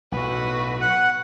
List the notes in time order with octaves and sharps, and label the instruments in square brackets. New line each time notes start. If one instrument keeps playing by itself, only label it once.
[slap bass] B1 A2 [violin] F#4 B4
[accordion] F#5